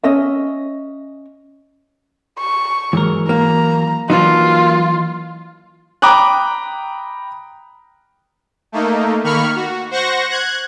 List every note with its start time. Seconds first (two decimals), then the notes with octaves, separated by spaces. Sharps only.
0.03 C#4 D#5 E5
2.40 C#6
2.93 G#2 E3 F#3 A#4
3.29 A#3 A#5
4.10 E3 F#3 A#3 D4 D#4 F4
6.02 G5 A#5 B5 D6 D#6 F#6
8.72 A3 A#3 D#4
9.24 D#3 A#3 B5 C#6 F6
9.55 F#4
9.91 C5 F#5 C#6 A#6
10.30 F#6 G#6